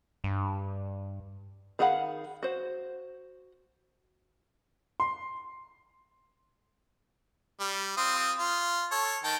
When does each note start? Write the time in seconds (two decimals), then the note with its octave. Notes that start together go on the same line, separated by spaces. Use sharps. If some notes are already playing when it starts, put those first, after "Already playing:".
0.24 G2
1.79 D#3 G#4 F5 F#5 B5
2.43 F#4 C5
5.00 C6
7.60 G3
7.97 C4 F4 D#6
8.38 F4
8.91 A4 C#5
9.24 D#3 G5 A5